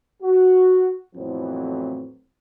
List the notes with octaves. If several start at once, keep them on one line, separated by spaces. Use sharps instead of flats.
F#4
F2 A2 E3 F#3 B3 C4